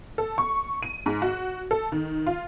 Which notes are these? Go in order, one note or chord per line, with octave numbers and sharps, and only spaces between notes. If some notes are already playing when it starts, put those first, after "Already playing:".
A4
C#6
D#7
G#2
F#4
A4
D#3
F4